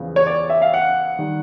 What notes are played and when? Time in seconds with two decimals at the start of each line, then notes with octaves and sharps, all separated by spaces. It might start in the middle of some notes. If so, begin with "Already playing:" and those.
Already playing: E2 C#3 F3
0.16 C#5
0.27 D5
0.50 E5
0.62 F5
0.74 F#5
1.19 D#3 G3